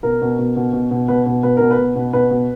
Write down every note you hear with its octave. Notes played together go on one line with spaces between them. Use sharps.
B2 A#4
B2
B2
B2
B2
B2
B2 B4
B2
B2 B4
B2 A#4
B4
B2
B2
B2 B4
B2